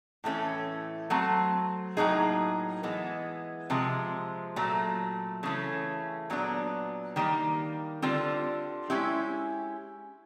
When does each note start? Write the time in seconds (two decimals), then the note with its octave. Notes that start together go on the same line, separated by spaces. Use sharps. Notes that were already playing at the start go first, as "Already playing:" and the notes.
0.24 A2 E3 A3 C#4
1.10 F#3 A3 C4
1.97 A2 F#3 A#3 D#4 G#4
2.83 E3 G#3 B3
3.70 C3 F3 G#3
4.56 A#2 F#3 A3
5.43 C#3 E3 A3 C#4
6.30 A#2 F#3 B3 D4
7.16 D#3 G3 A#3
8.02 D3 G3 C4 F4
8.90 G#3 C#4 E4 G4